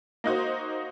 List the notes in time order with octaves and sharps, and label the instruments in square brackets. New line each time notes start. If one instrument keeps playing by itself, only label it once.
[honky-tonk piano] A#3 D#4 F#4 C5